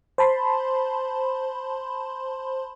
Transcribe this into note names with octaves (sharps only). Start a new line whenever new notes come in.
C5 A5 B5 C6